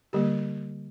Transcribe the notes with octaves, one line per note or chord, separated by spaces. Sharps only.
D3 G3 A#3 G4